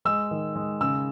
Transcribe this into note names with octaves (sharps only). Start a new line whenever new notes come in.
G#3 E6
D#3
G#3
C#3 E6